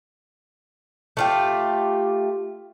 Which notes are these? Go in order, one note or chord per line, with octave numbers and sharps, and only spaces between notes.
A3 F4 G4